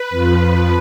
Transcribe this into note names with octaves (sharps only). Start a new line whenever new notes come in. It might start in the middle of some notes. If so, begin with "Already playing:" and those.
Already playing: B4
F2 F3